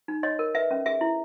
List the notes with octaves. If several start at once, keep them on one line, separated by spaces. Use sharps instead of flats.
D#4
C#5 D#5
A#4
B4 E5
C#4
G#4 E5
E4